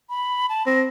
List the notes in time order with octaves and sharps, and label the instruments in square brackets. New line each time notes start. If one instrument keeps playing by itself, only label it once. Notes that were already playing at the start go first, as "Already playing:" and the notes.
[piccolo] B5
A5
[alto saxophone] C4 [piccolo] A#6